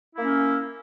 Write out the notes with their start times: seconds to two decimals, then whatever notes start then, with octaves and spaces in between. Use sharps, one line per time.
0.15 E4
0.18 A#3
0.21 C#4